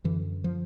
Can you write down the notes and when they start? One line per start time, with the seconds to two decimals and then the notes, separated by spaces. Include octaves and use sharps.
0.04 F#2 D3 E3
0.44 F3